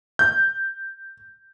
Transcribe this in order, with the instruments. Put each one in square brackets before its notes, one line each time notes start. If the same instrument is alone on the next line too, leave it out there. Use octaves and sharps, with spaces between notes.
[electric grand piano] G6